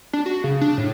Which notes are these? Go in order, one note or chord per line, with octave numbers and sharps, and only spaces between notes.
D4
F#4
C#3
D4
A2